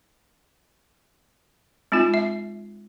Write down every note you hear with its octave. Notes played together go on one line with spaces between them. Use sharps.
G#3 C4 D#4 F4 G#5
E5